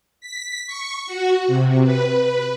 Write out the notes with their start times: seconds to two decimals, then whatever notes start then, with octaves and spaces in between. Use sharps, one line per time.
0.21 B6
0.67 C#6
1.07 F#4
1.47 C3
1.83 B4
2.23 B4